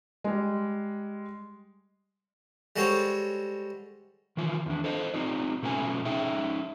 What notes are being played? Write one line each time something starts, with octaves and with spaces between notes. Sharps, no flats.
G3 G#3
G3 G#3 F#4 A4 C5 C#5
D#3 E3 F4
E2 D4
A4 C5 D#5
C4 D#4 F4 D5
B2 A3 C#4 F4 G#5
C#4 D#4 G#4 E5 G5